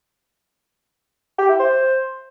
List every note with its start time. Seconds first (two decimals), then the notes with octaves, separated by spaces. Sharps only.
1.38 G4
1.49 E4
1.59 C5